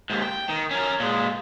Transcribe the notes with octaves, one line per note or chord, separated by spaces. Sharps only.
D#2 G#2
G5
D#3
C#4 A#4
A#2 G#3